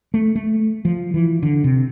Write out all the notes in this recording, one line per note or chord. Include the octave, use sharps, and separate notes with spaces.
A3
A3
F3
E3
D3
C3